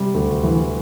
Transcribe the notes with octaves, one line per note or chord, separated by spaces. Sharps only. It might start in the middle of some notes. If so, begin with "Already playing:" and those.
Already playing: C3 G3
D2
E3